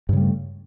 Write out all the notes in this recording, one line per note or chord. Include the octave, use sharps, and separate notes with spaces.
G2 C#3 G3 A3